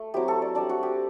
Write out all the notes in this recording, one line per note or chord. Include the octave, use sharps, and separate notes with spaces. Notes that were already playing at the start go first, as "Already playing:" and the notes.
Already playing: A3
F#3 C4 E4 G4
A4
D5
G3 D4 D5
F#4
G4